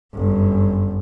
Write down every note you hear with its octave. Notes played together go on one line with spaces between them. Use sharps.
G1 F#2